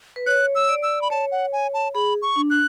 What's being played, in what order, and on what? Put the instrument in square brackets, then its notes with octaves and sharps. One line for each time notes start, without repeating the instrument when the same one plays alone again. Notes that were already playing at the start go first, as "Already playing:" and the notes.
[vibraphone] B4
[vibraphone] C#5 [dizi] F#6
[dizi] E6
[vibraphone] D5
[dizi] E6
B5
[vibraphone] C#5 [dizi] A5
[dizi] F#5
G#5
A5
[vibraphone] G#4 [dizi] B5
[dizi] C#6
[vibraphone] D4
[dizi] F#6